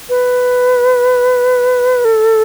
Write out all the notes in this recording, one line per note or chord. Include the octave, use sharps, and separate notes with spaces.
B4
A4